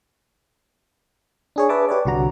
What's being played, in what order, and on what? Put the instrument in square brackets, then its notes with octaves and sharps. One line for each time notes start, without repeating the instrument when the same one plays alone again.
[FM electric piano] D4 G#4 C#5
B4 E5 A5 D6
G4 B4 C#5 D5
C2 D3 F#4 A#5